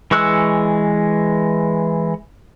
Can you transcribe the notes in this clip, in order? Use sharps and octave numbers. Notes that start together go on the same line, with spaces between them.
E3 G#3 C#6 E6 F#6